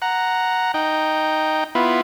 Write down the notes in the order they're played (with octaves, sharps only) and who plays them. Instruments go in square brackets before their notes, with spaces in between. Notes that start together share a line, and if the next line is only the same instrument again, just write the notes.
[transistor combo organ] F#5 A#5
D#4 G5
B3 E4 F4